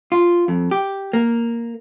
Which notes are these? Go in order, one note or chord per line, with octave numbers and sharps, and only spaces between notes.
F4
F2
G4
A#3